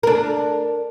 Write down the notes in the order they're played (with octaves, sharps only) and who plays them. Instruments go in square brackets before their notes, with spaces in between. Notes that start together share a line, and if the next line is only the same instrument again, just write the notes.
[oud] D4 A#4